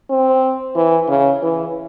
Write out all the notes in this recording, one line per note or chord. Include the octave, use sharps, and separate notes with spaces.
C4
E3
C#3
E3